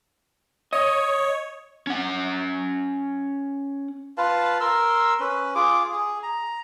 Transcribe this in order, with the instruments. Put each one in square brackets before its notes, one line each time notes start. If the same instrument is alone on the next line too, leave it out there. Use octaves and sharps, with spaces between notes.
[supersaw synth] C#5 [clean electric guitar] D#5
[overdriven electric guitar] C#4 F#5
[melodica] F4 B4 F5 A5
A#4 C6 E6
C#4 B4
F4 G#4 D6
G#4
A#5